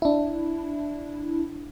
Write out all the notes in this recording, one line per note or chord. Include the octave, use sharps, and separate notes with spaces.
D4 E4